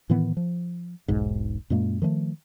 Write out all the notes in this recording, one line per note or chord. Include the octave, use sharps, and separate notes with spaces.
A2 D#3 E3 B3
F3
E1 B1 G#2
F#2 A#2 G#3 A#3
D#3 F3 G#3 A3